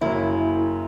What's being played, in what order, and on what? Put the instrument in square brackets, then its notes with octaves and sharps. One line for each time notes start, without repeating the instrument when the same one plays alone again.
[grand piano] F#1 F#2 C#3 F#3 [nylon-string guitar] E4